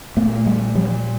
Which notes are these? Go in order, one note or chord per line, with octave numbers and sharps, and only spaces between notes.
A#2 A3 B3
G3 A3
F3 G3